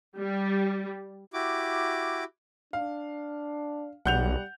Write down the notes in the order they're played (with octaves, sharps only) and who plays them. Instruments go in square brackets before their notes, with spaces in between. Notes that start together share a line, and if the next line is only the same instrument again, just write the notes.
[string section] G3
[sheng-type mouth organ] E4 F#4 G4 D6
[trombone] D4 [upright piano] F5
[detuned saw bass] B1 [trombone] G3 [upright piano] F#5 G6 F7